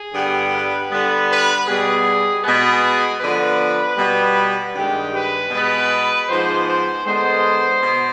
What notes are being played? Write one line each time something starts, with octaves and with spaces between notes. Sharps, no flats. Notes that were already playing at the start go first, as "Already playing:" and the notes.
Already playing: G#4
G2 D3 G3 B3
B4
D3 G3 B3
B4
B2 G3 B3 G#4
B2 G#3 B3 G#4
D3 F3 B3 B4
B2 G3 B3
G2 D#3 G#3 G4
B4
B2 G#3 B3 B4
G#2 F3 B3 C5
C5
D3 G#3 B3 C5
B2